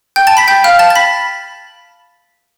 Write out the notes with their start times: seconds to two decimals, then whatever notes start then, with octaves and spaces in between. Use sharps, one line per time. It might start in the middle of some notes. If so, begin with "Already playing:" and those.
0.16 G5 G6
0.27 A5 A6
0.37 B5 B6
0.48 G5 G6
0.64 F5 F6
0.79 A5 A6
0.90 A6
0.95 B5 B6